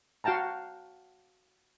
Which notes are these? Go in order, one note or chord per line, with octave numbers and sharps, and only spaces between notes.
F#4 F5 G5 A5 A#5